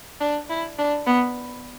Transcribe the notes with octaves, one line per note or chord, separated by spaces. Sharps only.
D4
E4
D4
B3